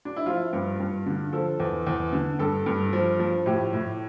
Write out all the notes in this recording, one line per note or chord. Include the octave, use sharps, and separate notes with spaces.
D4
E4
F3 F4
G2
G2
D3
F3 A4
E2
E2
D3
G2 A4
G2
F3
F3
A2 G4
A2